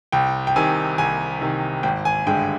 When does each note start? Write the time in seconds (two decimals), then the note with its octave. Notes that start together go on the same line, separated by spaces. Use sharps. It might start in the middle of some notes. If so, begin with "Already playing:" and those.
0.12 C2 G5
0.47 G5
0.56 C3 D#3 G#5
0.98 C2 G#5
1.41 C3 D#3
1.83 G#1 G5
2.05 G#5
2.27 G2 D3 G#3 G5